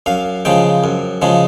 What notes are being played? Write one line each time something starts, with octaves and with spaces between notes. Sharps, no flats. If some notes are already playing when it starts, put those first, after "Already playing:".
F#2 F5
C#3 F3 G#3 G5
F#2
C#3 F3 G#3